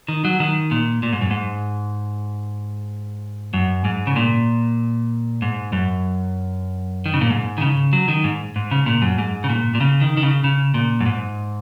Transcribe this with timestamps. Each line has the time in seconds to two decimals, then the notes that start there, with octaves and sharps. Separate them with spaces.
0.08 D#3
0.25 F#3
0.40 D#3
0.71 A#2
1.03 A#2
1.13 G#2
1.21 F#2
1.31 G#2
3.54 F#2
3.85 G#2
4.07 C#3
4.16 A#2
5.42 G#2
5.73 F#2
7.06 D#3
7.14 C#3
7.21 A#2
7.30 G#2
7.58 D#3
7.61 C#3
7.93 F#3
8.08 D#3
8.24 G#2
8.56 G#2
8.71 C#3
8.86 A#2
9.02 F#2
9.18 G#2
9.44 C#3
9.49 A#2
9.75 A#2
9.81 C#3
10.01 D#3
10.17 D#3
10.23 C#3
10.44 C#3
10.74 A#2
11.00 F#2
11.06 G#2